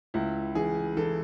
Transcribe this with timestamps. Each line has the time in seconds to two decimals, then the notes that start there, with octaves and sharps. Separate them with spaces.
0.14 C#2 E4
0.55 E3 G#4
0.97 E3 A4